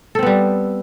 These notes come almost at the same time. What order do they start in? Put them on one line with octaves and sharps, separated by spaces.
A4 C4 B3 G3